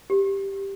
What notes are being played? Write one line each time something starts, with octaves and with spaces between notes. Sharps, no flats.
G4